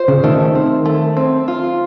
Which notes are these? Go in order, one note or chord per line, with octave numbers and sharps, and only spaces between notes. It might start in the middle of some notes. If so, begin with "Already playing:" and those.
Already playing: F4 C5
C#3
D#3 A3
C4
A3
C4
F4